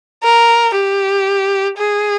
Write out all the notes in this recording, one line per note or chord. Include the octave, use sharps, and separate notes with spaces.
A#4
G4
G#4